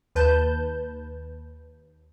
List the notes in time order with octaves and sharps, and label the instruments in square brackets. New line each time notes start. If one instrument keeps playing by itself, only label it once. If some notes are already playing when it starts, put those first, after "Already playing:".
[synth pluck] D#2 B4 A5 G6